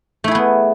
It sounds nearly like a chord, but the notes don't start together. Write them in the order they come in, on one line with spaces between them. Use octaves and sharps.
A3 E4 G#4 B3